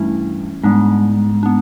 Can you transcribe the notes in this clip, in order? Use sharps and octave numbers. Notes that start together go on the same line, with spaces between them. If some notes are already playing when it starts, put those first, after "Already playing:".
Already playing: G2 E3 A3 C#4 E4
G#2 G3 B3 D4
B3 D4